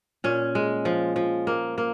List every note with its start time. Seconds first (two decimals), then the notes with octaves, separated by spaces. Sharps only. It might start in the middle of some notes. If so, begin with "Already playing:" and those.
0.24 A#2 C#4
0.55 G#3
0.85 F3
1.16 F3
1.47 A#3
1.78 A#3